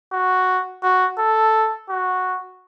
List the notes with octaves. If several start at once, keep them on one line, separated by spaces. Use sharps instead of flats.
F#4
F#4
A4
F#4